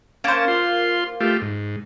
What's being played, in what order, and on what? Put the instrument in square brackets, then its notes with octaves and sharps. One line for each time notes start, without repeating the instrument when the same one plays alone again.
[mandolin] A#3 C5 [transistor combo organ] C#4 A5
[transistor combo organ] F4 C6
A3 F4 G4
G#2